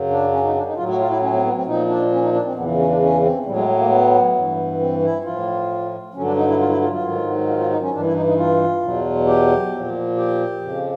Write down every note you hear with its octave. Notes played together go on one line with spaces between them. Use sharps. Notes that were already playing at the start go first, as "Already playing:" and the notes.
Already playing: F#2 C#3 F#3
D4
C#4
D#4
D4
D#4
A2 F#3 F4
F#4
F4
E4
C#4
C4
B3
C4
A#2 F3 D#4
D4
C#4
D#4
D4
C4
E2 C#3 E3 B3
C#4
D4
C#4
C4
A2 F#3 G3
G#3
A3
A#3
B3
G2 E3
C4
E4
A2 F3 F4
G2 D3 F#3 C#4
D4
D#4
E4
F4
E4
F4
F4
G#2 D#3 F#3
F4
F4
D#4
C#4
G2 E3 D4
E4
D#4
D#4
F4
E2 B2 F#3
G4
A#2 F3
G4
F2 C#3 F3